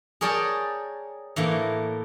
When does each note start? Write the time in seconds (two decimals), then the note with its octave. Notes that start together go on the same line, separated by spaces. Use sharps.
0.21 G#4 A#4 C#5 D5 G5 A5
1.36 A2 E3 A#3